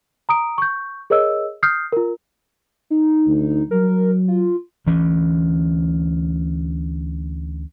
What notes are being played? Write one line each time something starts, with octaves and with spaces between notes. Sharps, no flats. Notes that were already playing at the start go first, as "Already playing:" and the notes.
A#5 D#6 D7
C#6 G6
G#4 A#4 C#5 D#5 E6
D#6 F6 G6 C7
F4 A#4
D#4
D2
F#3 A#4
F4
D2 E3 C#4